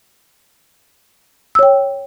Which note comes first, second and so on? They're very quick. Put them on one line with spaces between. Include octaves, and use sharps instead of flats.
E6 C#5 G5